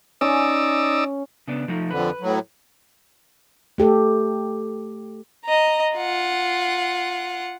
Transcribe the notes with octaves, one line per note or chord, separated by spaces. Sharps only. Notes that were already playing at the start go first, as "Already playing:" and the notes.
C#4 D#4 D5 E6
C#3 B3 D4
F3 A3 D#4
F2 D3 B4
A2 F#3
A3 G4 A4
D#5 A#5
F4 F#5